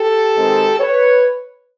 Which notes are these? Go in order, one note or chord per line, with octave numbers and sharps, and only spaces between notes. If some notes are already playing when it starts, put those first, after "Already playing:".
Already playing: G4 A4
D#3 G#3 C4
B4 C#5